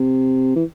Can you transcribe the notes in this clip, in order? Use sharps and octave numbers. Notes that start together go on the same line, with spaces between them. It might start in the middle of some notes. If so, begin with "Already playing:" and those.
Already playing: C3
E3